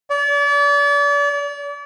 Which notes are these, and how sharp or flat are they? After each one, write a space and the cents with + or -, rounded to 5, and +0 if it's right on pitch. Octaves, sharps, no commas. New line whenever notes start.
D5 -40